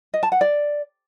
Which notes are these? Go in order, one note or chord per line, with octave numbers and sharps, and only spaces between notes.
D#5
A5
F#5
D5